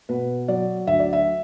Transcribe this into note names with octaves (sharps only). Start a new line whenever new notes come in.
B2 B4
F#3 D5
D2 E5
D5
E5